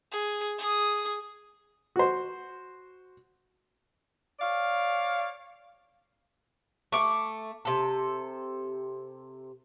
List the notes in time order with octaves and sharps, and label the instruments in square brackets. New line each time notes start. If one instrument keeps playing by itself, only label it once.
[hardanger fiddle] G#4
G#4 D#6
[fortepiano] F#4 C5
[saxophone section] C#5 D5 F5
[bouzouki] A3 [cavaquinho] C#6 D6
[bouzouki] C3 A4